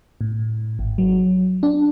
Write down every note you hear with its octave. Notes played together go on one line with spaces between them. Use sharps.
A2
G#1
F#3
D4